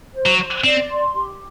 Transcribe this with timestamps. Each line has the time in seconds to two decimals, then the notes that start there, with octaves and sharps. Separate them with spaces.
0.14 C5
0.26 F#3
0.38 C5
0.64 C4 D5
0.90 C6
1.15 G4